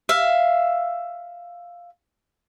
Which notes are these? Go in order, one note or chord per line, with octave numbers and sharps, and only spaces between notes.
E5 F5